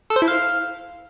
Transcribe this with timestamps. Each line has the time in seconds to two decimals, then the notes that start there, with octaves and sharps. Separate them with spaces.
0.10 A4
0.16 C5
0.22 E4
0.28 F5